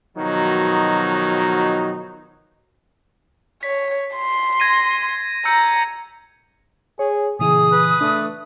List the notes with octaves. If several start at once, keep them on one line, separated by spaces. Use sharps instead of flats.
B2 D#3 F3 F#3 D#4
C#5 B6
C6
G#6 A#6 D#7
A#5 E6 G6 C#7
G#4 C#5
A#2 C#3 E3 G#4 D#6
B4
A3 D4